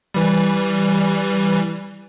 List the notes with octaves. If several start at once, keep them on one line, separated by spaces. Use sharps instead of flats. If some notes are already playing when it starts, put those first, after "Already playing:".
E3 G3